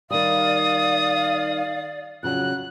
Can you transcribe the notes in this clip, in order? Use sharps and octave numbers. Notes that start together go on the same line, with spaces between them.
D#3 G3 D5 F5 D#6
F2 C#3 F#3 F#6